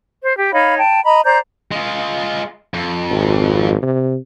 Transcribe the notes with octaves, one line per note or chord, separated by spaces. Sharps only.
C5
G4
D#4 C#5 F5 B5
G5 A5
D#5 A#5 B5
C5 D5 A#5 G6
G#3 F4
F2
G#1
C3